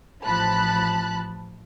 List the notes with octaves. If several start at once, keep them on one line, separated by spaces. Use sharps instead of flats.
A1 F3 A5 B5 F#6